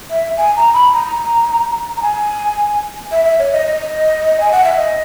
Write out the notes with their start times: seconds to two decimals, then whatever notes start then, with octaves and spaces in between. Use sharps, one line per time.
0.10 E5
0.38 G#5
0.56 A#5
0.74 B5
0.93 A#5
1.97 A#5
2.02 G#5
3.12 E5
3.25 E5
3.39 C#5
3.53 D#5
3.67 D#5
4.40 G#5
4.52 F#5
4.64 E5
4.76 D#5